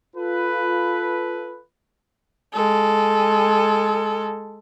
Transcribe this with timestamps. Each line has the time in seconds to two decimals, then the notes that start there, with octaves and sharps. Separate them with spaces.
0.16 F4 A4 B4
2.53 G#3 A4